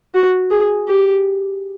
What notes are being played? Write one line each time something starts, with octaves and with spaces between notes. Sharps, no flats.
F#4
G#4
G4